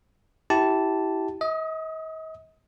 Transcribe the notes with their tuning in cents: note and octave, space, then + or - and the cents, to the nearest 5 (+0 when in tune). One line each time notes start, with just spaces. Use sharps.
E4 -10 G4 -25 A5 +0
D#5 +40 D#6 +0